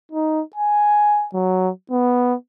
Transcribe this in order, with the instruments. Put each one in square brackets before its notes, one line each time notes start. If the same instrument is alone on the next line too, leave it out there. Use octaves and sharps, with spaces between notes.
[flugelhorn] D#4
G#5
F#3
B3